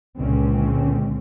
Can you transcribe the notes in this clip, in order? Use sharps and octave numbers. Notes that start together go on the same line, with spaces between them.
C#2 A#2 D3 C4 C#4